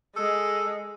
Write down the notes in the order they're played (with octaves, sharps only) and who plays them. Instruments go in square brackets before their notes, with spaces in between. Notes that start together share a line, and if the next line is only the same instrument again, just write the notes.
[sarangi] G#3 [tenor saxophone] A4